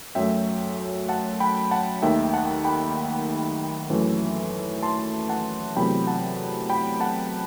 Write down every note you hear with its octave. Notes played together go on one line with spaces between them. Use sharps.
F#2 F#3 A3 E5 G5
F#5 A5
G5 B5
F#5 A5
D#2 D#3 A3 E5 G5
F#5 A5
G5 B5
F#2 E3 A3
A5 C6
F#5 A5
E2 C3 F#3 A3 G5 B5
F#5 A5
G5 B5
F#5 A5